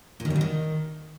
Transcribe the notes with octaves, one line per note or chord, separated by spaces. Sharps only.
A#2
D#3
G3
D3
D#3